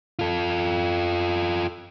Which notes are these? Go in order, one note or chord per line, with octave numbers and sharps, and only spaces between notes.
F4 A4